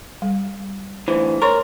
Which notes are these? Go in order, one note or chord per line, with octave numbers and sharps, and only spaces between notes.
G3
D2 E3 C5
A#4 C#5 C6 C#6